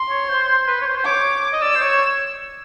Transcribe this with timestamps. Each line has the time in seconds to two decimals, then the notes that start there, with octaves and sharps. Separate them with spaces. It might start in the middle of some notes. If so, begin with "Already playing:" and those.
Already playing: C6
0.10 C#5
0.29 C5
0.48 C5
0.67 B4
0.81 C#5
0.86 C5
0.97 C5
1.05 C#5 D6
1.53 D#5
1.62 D5 E6
1.75 C5
1.81 C#5